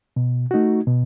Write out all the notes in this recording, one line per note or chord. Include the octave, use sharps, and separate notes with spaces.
B2
A3 D#4 F#4
B2